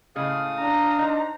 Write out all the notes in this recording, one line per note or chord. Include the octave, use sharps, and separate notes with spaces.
A2 C#3 G#3 F5 D#6
D4 A#5
D#4 C5